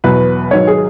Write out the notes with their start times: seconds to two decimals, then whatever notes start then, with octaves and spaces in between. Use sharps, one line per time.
0.04 E2 B2 F#3 B4
0.51 G#1 G#2 F#3 C#5
0.67 G#4